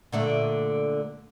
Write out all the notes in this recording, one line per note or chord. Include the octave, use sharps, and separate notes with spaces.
A#2 D3 A3